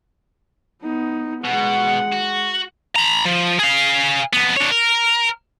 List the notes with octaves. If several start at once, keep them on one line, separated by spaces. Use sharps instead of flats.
B3 D#4
B2 G#3 F#5
F#4
A#5 B5
F3
G#4 F5
F2 B3
D4 C#5
A#4